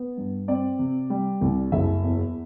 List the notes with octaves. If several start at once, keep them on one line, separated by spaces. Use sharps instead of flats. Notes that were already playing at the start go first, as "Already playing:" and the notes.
Already playing: B3
G2
C4 D5
C3
G3
C2
F#1 E5
E2